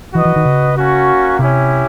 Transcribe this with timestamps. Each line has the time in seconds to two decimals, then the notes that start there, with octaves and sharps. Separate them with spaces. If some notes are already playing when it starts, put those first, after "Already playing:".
0.14 E3 F#4 B4 D#5
0.25 E3
0.36 D#3
0.45 C#3
0.77 A#3 C#4 F#4
1.38 C3 C#4 E4 G4